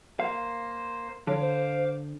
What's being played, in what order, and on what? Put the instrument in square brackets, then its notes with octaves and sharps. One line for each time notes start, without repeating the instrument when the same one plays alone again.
[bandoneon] A#3 C5 [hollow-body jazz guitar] F5
[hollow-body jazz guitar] D3 [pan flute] C#5 [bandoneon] F5 D6
[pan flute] C5